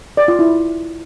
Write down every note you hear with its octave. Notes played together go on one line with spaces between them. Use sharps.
D5
F4
E4